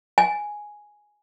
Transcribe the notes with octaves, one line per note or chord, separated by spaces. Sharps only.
G#5